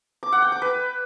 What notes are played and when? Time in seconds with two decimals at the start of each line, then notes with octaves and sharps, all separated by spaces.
0.23 D6
0.32 F#5
0.42 G5
0.52 D6
0.62 B4